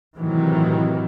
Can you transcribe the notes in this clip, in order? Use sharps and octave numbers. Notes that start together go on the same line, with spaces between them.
A2 C3 D#3 E3 F#3